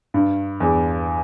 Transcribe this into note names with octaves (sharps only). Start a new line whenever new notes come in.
G2
E2